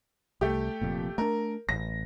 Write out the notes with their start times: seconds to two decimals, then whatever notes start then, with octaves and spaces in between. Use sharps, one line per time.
0.41 C2 A3 G4
0.81 F1 F2 A#2
1.18 A3 D4 A#4
1.69 A1 A#6